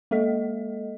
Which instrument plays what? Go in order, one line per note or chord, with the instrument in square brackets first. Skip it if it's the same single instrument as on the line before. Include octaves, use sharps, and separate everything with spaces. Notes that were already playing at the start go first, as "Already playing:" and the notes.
[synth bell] G#3 A#3 A4 D#5